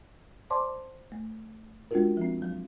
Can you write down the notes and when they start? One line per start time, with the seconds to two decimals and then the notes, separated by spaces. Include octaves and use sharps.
0.50 C5 D5 A5 C6 D6
1.12 A3
1.91 G#3 C#4 D4 F4 F#4 A#4
2.17 F3 C4
2.42 F#3